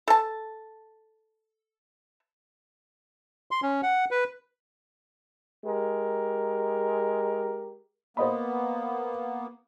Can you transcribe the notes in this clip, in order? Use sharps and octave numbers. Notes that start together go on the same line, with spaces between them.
A4 A5
C6
C#4
F#5
B4
G#3 G4 A#4
A#3 B3 C5 D#5 B5